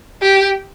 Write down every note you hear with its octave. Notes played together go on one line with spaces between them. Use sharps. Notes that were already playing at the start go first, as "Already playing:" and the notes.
G4